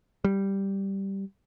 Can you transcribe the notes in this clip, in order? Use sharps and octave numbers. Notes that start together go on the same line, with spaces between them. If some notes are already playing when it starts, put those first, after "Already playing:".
G3